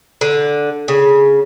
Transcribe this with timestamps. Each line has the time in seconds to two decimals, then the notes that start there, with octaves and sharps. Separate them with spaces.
0.21 D3
0.88 C#3